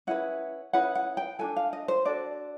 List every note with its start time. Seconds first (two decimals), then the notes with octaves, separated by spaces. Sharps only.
0.07 C#4 E4 G#4 B4 F#5
0.73 C#4 E4 G#4 B4 F#5
0.95 F#5
1.17 G5
1.39 D4 F#4 A4 G#5
1.56 F5
1.73 D#5
1.88 C5
2.05 D4 F#4 A4 D5